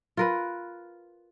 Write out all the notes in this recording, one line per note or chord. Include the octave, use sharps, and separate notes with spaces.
F4 A#4 B4